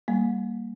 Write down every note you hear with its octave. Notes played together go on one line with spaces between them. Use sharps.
G3 A#3